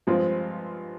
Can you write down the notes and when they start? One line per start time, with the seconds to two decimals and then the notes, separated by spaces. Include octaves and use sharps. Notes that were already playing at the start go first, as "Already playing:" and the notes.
0.07 G2 F3 G#3 C4 F4